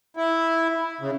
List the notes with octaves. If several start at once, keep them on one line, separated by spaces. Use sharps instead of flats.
E4
C#3